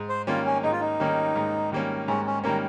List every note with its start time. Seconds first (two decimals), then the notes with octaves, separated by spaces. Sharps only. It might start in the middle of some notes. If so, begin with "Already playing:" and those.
Already playing: G#2
0.09 C5
0.27 D#3 G3 A#3 C#4 F4
0.45 C#4
0.63 G#2 D#4
0.72 F4
0.81 D#4
1.00 D#3 G3 A#3 C#4
1.36 G#2
1.72 D#3 G3 A#3 C#4
2.08 G#2 C#4
2.26 C#4
2.44 D#3 G3 A#3 C#4 A#4